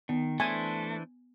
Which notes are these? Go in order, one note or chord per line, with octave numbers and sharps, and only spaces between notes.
D#3 B3
E3 A3 D4 C5 G#5